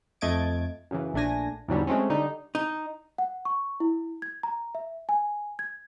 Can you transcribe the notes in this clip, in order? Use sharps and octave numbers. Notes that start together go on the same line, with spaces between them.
F2 A3 D#5 G#6 A6 D7
F#2 C#3 E3
A#1 A3 D4 G#5 A#6
E2 G#2 D3 F#3 G3
G#3 A3 C4 C#4
D3 G3 D#4
D#4
F#5
C#6
E4
G#6
A#5
E5
G#5
G#6